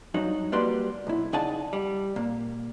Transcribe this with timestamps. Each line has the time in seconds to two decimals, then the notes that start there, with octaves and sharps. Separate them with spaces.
0.14 G2 F#3 D#4 F#4
0.52 G3 A#3 F#4 B4 D5 C6
1.07 B1 E4
1.33 C#3 D#4 D5 F#5 G#5 A5
1.73 G3
2.16 A#2 A#3